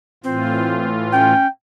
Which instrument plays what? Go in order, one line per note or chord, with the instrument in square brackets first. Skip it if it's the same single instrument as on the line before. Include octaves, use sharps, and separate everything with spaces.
[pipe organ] A2 E3 F4 [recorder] C4
[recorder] C#4 [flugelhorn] G5